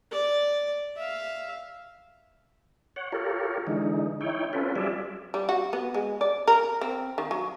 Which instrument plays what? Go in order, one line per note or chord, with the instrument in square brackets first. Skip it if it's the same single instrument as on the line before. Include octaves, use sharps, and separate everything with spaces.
[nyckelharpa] D5
E5 F5
[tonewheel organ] C#5 F#5
F4 G4 A4 A#4 C#5
D3 E3 G#3 D#4
D#4 E4 C#5 G5
C4 C#4 F4 A4 B4
F#3 G3 F4 G#4 D5 E5
[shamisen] G3
F#4
B3
G#3
D5
A#4
C4
D#3
F#3